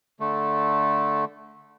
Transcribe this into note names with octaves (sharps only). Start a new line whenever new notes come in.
D3 A3